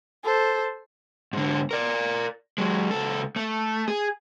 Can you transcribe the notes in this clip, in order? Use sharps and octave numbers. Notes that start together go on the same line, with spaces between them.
A4 C5
G#2 D3
A#4 D5
F#3 G#3
C#2 A4
A3
G#4